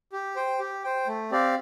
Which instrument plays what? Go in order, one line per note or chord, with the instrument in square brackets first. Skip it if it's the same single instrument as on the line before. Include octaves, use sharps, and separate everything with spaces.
[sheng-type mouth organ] G4
C5 G5
G4
C5 G5
A3
C4 G4 D5 F5